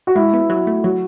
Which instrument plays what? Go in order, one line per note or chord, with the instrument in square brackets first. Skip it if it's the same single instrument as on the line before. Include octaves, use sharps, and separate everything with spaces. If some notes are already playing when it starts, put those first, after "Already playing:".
[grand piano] F#4
[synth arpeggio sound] G#3 [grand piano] E4
[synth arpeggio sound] B3
[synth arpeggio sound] F#3 [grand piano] F#4
[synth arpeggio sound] A3
[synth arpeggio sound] F#3 [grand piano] F#4